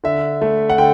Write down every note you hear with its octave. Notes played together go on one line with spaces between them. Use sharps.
D3 E5
A3
F#5
D3 G5